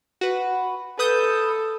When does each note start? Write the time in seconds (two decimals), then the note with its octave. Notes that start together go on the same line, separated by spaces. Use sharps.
0.21 F#4 B4
0.99 A4 B4 D#6 G6